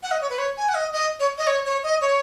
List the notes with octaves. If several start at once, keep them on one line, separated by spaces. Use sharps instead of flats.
F#5
D#5
C#5
B4
C#5
G#5
F#5
D#5
D#5
C#5
D#5
C#5
C#5
D#5
C#5